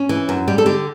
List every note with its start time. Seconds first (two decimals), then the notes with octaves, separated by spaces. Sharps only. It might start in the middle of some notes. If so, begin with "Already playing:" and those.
Already playing: C#4
0.09 E3
0.29 F#2
0.48 G3 G4
0.58 A4
0.66 D3 G4